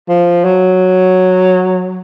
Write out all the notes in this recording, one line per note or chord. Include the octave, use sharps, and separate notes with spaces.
F3
F#3